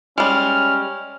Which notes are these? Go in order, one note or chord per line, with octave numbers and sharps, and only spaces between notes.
G3 G#3 C#4 F6